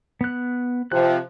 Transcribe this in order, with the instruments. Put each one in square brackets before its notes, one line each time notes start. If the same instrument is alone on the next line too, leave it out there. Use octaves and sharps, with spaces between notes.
[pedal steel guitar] B3 F#6
[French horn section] C3 F3 [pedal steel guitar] F#6